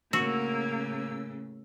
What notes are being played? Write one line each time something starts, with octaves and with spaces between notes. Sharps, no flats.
A2 C#3 A#3 F#4 E6